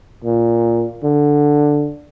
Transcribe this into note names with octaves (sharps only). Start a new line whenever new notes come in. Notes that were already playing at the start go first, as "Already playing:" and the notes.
A#2
D3